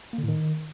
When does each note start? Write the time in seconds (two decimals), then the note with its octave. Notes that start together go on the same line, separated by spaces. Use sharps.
0.13 A#3
0.18 D3
0.23 A2
0.28 D#3